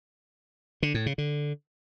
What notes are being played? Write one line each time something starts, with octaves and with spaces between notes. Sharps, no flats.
D3
A2
C#3
D3